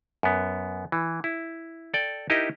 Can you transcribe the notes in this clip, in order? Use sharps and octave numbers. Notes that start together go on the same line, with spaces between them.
F#2 B3
E3
E4
A4 D5 G5
D#4 E4 G4 A#4 D#5